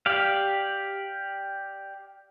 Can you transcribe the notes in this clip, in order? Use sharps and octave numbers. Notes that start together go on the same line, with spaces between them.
G4 D5 F5